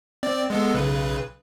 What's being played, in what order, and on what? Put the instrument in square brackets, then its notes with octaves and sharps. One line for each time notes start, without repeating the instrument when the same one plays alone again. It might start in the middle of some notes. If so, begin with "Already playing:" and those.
[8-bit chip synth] C4 D5
G#3 B3 A4
B1 C#3 B4